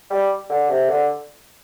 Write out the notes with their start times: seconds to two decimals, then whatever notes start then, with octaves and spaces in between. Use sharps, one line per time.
0.11 G3
0.50 D3
0.69 C3
0.89 D3